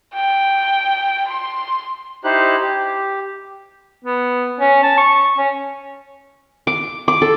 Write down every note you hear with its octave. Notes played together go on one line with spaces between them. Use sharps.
G5
C6
D#4 E4 G4 C5 F#6
G4
B3
C#4
A5
C#6
C#4
D6
D6
A4